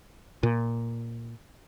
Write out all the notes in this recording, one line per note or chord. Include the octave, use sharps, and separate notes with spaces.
A#2